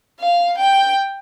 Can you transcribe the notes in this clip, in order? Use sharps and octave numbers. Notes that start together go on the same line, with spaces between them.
F5
G5